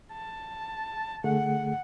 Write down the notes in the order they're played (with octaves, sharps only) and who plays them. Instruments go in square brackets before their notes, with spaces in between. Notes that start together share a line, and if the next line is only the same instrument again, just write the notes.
[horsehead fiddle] A5
[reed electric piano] D3 A3 G#4 [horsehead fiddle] F#5